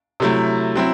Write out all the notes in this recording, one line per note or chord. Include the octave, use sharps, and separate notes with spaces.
C3 F#3 A3 E4
F#3 C4 E4